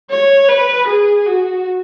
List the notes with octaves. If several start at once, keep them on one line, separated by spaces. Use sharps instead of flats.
C#5
B4
G#4
F#4